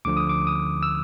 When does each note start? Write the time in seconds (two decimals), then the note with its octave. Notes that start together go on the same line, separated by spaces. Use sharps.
0.05 D2 D3 F3 D6
0.17 D#6
0.29 D6
0.47 D#6
0.83 E6